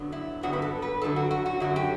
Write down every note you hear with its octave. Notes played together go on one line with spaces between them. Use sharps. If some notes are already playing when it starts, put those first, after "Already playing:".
Already playing: G2 D3 F#3 B3
E4
G2 D3 F#3 B3 F#4
B4
A4
B4
F#2 D3 F#3 A4
F#4
F#4
F#4
F#2 D3 F#3 F#4
G4